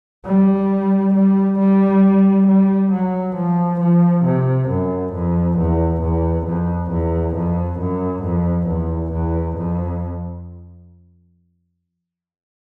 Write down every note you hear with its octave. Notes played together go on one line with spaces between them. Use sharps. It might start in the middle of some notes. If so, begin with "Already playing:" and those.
G3
G3
G3
G3
F#3
F3
F3
C3
F#2
F2
E2
E2
F2
E2
F2
F#2
F2
E2
E2
F2